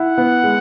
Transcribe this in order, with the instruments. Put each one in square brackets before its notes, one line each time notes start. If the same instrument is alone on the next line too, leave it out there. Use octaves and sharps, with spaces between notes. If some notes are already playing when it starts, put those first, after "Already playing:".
Already playing: [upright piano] E4 [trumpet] F#5
[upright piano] B3
G#3